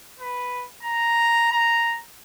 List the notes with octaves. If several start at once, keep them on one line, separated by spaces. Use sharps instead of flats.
B4
A#5
A#5